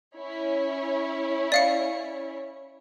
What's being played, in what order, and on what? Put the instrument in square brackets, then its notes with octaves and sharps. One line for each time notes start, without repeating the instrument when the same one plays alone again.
[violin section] C#4 E4 C#5
[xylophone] D5 F5 C#7